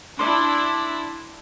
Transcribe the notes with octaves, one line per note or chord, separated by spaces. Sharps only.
D4 E4 C6 D6